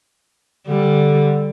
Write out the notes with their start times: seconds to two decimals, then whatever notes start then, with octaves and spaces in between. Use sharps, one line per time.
0.68 D3 G3